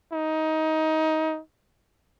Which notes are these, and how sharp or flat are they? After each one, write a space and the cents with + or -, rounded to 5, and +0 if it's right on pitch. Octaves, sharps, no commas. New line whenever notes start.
D#4 +20